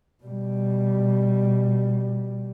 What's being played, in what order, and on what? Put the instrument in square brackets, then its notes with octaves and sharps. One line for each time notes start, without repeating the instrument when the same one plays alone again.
[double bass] B2 G3